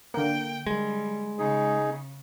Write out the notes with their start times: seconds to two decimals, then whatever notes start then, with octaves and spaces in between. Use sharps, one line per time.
0.14 D3 A#3 G5
0.67 G3 G#3
1.39 C#3 D#4 G#4